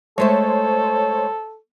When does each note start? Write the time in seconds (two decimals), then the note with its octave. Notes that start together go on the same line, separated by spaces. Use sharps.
0.18 G#3 A3 A4 C5 C#5 A5